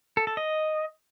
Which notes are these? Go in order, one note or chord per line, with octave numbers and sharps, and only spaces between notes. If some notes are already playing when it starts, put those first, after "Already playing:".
A4
A4
D#5